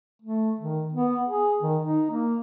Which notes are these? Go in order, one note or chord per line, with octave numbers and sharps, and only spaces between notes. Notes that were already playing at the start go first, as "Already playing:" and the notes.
A3
D#3
B3
G#4
D#3
D#4
A#3